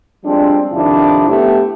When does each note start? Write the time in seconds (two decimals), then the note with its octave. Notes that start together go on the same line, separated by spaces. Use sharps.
0.25 F3 G3 G#3 C4 D4
0.72 F2 C3 D#3 F3 D4 E4
1.28 A3 B3 E4 G4